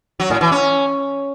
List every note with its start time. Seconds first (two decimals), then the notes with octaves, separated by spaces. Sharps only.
0.20 F#3
0.30 A2
0.41 E3
0.52 C#4